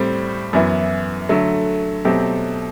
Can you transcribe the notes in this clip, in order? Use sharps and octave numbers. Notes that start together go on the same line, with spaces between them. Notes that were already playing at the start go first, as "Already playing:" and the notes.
Already playing: A2 G3 C4
F#2 E3 B3 E4
D3 F#3 A3
B2 F#3 A3 C4 G4